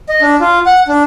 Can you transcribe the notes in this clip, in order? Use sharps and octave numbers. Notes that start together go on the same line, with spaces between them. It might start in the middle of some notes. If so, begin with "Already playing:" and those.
D#5
D4
F4
F#5
D4